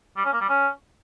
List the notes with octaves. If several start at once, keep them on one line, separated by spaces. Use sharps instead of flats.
G3
C#4
A#3
G3
C#4